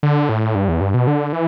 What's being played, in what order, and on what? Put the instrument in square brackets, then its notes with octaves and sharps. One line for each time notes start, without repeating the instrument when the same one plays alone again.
[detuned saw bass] D3
A2
G2
E2
G2
B2
D3
E3